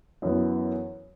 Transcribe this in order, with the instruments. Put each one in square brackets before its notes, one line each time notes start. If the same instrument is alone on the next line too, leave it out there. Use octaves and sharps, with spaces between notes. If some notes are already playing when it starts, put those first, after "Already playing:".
[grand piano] F#2 E3 B3